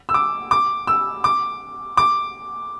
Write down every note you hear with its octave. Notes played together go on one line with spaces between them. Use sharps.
E6
D6
D6
E6
D6
D6